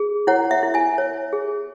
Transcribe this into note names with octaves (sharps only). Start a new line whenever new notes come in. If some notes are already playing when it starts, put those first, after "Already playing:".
Already playing: G#4
E4 C#5 F#5
E5
E4
E5 G#5
C#5
G#4